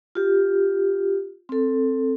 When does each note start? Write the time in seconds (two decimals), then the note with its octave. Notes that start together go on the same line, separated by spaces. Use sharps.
0.15 F4 G4
1.49 C4 A4